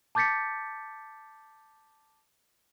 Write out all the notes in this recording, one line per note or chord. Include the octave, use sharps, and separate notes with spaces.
A5 D6 G6 A6 B6 C#7